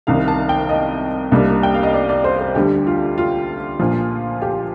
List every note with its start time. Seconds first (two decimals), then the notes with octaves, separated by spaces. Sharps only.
0.07 C2 C3 D#3 F5
0.28 A5
0.49 G5
0.69 D#5
1.32 C2 C3 G3 A#3 D4
1.63 G5
1.74 F5
1.83 D#5
1.94 D5
2.09 D5
2.24 C5
2.40 C5
2.55 D2 D3 G3 G4
2.87 F4
3.18 F4
3.80 A#1 A#2 F3
4.42 G4